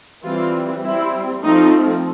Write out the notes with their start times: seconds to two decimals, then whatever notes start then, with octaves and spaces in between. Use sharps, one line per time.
0.24 E3 G3 C4 F4
0.83 G3 C4 E4
1.42 F3 A3 C4 D#4